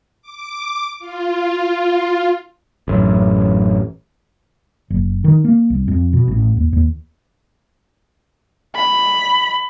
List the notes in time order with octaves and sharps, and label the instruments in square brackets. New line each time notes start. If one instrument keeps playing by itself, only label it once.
[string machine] D6
F4
[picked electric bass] A1 F#2
[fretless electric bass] F#1
D#3
A#3
C2
F2
B2
A1
D#2
D#2
[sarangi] B5